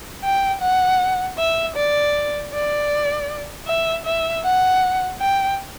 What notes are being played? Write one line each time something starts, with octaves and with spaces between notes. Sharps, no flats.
G5
F#5
E5
D5
D5
E5
E5
F#5
G5